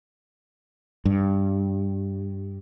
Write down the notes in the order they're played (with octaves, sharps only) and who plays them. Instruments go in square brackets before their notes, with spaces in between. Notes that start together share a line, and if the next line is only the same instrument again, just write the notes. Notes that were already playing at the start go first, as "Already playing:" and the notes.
[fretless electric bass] G2